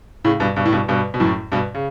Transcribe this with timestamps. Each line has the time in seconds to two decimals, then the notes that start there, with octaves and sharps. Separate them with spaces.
0.25 A2 C#3
0.40 G2 B2
0.56 G2 B2
0.66 A2
0.73 G2 B2
0.88 G2 B2
1.14 B2
1.20 F#2 A2
1.52 G2 B2
1.75 C#3